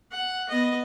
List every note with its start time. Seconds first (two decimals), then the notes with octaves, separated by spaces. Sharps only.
0.12 F#5
0.49 B3 D#5